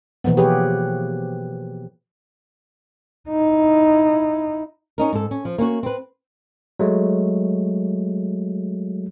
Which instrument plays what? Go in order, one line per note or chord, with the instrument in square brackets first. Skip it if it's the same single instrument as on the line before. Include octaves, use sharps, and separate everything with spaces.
[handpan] B2 E3 F3 A#3 B3
G4 G#4 B4 C#5
[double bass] D#4 E4
[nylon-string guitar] C#4 D#4 A#4
G#2 A4
C#4
F3
A#3 C#4 F4 F#4
C4 B4
[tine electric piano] F#3 G#3 A3